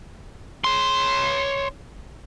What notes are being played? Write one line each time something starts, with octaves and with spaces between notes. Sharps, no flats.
C#5 C6